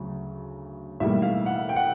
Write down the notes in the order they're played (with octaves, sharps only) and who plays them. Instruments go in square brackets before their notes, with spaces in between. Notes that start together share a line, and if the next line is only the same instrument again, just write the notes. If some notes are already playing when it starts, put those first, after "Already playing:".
Already playing: [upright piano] D2 C#3 F#3
B1 A2 E3 G3 A#3 E5
F5
F#5
G5
F#5